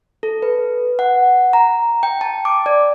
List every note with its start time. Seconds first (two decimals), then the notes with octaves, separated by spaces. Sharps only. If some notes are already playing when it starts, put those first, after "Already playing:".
0.23 A4
0.42 B4
0.99 F#5
1.53 A#5
2.03 G5
2.21 A5
2.45 D6
2.66 D5